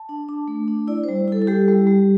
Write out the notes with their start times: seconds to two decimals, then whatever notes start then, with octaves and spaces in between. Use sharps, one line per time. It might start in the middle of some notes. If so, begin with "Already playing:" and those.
Already playing: A5
0.09 D4
0.29 D4
0.48 A3
0.68 D4
0.88 E4 D5
1.04 G3 C5
1.28 E4 A4
1.42 A4
1.47 G3 G4
1.68 G3
1.87 G3